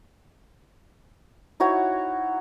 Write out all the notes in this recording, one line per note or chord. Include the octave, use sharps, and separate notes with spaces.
D#4 E4 F#4 C#5